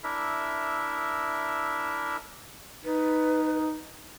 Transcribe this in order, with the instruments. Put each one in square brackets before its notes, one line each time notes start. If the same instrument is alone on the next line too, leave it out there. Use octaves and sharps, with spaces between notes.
[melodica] D4 E4 A#4 E5
[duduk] D#4 [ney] B4